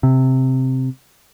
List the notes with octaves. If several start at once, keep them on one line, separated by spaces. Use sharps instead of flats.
C3